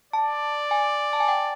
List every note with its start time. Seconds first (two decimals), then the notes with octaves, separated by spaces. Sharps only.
0.13 D5 A5
0.71 G#5
1.13 A5
1.20 G#5
1.28 G5